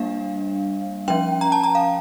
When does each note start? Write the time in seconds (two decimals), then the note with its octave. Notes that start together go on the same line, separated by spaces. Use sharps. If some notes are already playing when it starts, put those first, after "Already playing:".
Already playing: G3 A#3 D4 F5
1.08 F3 C#4 G5
1.41 A#5
1.52 A5
1.63 A#5
1.75 F5